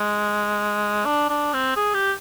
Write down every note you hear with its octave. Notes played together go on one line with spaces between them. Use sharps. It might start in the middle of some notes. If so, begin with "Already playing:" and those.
Already playing: G#3
D4
D4
C4
G#4
G4